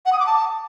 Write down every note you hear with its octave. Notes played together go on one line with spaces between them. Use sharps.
F#5
D#6
D6
A5